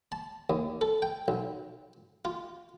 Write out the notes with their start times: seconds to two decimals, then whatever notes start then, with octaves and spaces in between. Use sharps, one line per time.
0.12 A5
0.50 D#2
0.81 A4
1.02 G5
1.28 B1
2.25 F4